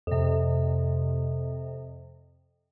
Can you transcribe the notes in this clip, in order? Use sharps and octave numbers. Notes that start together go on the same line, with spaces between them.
F2 C3